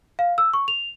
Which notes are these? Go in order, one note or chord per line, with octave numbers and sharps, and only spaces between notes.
F5
E6
C#6
F7